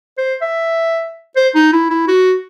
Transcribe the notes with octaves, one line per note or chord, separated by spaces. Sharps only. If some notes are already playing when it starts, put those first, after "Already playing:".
C5
E5
C5
D#4
E4
E4
F#4